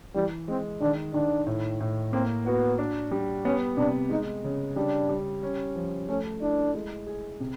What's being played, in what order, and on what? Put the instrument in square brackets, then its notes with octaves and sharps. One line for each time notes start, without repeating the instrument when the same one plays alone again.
[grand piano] E3 [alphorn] G3
[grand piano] G#3 [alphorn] C4
[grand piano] D#3 [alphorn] D4
[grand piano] D#3 [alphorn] D4
[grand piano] A2
A2
[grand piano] A#3 [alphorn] C4
[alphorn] B3 [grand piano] F#4
[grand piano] D4
G3
[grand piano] B3 [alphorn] C#4
[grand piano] C3 [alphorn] D4
[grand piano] G#3 [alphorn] D#4
[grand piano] C#3
[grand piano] G3 [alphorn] D4
[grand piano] G3
C#4
F3
[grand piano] A3 [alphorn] C#4
[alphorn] D4 [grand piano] E4
[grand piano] G#3
G#4
C3